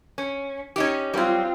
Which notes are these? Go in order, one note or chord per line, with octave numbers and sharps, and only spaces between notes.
C#4
C#4 D#4 G4
F#3 G3 C4 F4